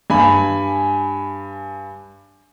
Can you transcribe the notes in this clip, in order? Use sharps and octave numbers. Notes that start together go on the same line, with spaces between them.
G2 G#5 B5